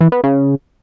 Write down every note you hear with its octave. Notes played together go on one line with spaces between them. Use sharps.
E3
B3
C#3